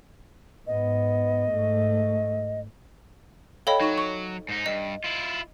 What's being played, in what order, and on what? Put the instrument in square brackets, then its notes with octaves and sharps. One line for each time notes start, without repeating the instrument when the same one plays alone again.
[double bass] G#2 B3 [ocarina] D#5
[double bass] G#2 A3
[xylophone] A4 C#5 D#5 [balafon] F5 G5 B5
[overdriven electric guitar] F#3 [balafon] D#4 C#6
[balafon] C#6
[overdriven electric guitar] G#2 D#4
[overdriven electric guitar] G2 [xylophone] D#5
[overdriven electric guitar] E4 F4